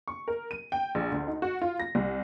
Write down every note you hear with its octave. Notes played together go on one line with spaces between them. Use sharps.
C#6
A#4
D#7
G5
A#1
D2
D#4
F#4
F4
A#6
C2